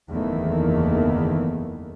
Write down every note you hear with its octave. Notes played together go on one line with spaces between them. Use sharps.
F#1 E2 D#3 E3 A3 A#3